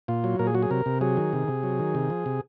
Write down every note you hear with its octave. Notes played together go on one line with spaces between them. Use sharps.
A#2 F4
F#3
A#2 A#4
G#4
F#3 F#4
G#4
C3 A#4
C3
F#3 G#4
D#3
C3
C3
F#3
D#3
C3
F3
C3